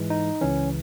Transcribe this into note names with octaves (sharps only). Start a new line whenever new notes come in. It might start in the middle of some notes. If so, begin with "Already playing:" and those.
Already playing: G#2 E3 G#3
D#4
C#2 C#3 E3 C#4